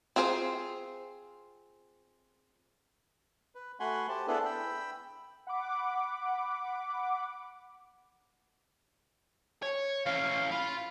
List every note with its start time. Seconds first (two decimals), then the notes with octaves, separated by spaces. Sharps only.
0.16 C4 F4 G#4 A#4 C5
3.55 B4
3.80 A3 F#4 F#5 G#5 B5 C6
4.09 G4 C5 A5
4.27 B3 D4 E4 G#4 A4 B4
4.45 G5 B5 E6
5.47 F#5 B5 D6
9.62 C#5
10.06 E3 C#4 F5
10.51 F4 B5